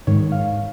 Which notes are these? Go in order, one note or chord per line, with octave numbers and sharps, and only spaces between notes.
G#2 D#3 C#5
F5